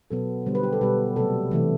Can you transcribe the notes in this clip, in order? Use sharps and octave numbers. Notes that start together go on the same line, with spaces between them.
B2 F#3 B3 A4
D3 G3 B3 C5
B4
G4
A4
B2 G3 B3 B4
C3 F#3 A3 A4
C3 E3 A3